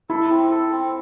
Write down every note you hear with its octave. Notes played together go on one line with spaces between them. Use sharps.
E4 A4
C4
A4
C4